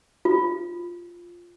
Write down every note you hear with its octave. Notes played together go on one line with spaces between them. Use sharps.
F4